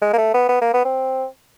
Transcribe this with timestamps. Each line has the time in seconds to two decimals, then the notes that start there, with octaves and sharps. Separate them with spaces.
0.02 G#3
0.14 A#3
0.18 A3
0.34 B3
0.49 B3
0.61 A#3
0.74 B3
0.85 C4